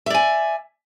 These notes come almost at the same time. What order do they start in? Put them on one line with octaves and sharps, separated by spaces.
E5 D5 G#5